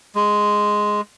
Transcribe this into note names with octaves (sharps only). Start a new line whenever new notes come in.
G#3